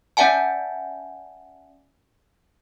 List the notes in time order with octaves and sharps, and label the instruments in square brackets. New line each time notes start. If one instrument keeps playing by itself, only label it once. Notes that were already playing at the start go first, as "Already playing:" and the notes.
[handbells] C#4 D5 E5 F#5 G#5 A5